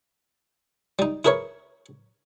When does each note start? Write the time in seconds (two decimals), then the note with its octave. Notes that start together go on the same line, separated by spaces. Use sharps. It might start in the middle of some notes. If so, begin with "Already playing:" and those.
0.99 G3 D#4
1.25 E4 G#4 A#4 B4 C#5